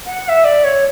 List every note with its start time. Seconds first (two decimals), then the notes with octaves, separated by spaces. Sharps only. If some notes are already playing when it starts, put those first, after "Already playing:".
0.06 F#5
0.24 F#5
0.29 E5
0.45 D5
0.64 C#5